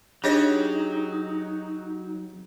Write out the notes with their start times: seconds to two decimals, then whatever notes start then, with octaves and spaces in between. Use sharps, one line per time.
0.24 F#3 D4 D#4 G4 G#4 C#5 D#5